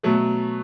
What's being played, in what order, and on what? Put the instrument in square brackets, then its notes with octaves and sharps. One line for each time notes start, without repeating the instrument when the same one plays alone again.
[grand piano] B2 F#3 A3